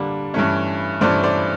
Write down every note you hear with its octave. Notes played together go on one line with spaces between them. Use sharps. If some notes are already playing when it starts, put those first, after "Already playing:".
Already playing: D3 G3 A#3 D4
G2 E3 A3 C#4
G2 E3 A3 C#4 C5 D5
C5 D5